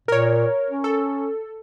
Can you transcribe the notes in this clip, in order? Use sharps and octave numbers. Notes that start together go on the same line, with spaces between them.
A#2 A#4 C#5
C#4
A4